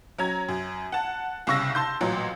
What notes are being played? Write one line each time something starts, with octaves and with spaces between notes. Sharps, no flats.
F#3 C#4 A#5 G#6
F#2
F#5 A5
C2 C#3 C#6 E6 A#6
A5 C6 G6
A1 A#2 F#3